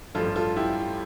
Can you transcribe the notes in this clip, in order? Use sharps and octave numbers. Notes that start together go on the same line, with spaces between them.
A1 G2 F3 A3 F4 A4
F4 A4
E4 G4